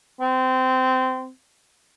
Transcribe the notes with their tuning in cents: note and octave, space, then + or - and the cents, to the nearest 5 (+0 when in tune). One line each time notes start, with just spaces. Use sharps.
C4 -20